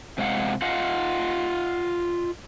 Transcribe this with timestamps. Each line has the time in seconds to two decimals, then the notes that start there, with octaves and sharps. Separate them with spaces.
0.18 C3 G#3 F5 F#5
0.62 F4 D#5 F5 F#5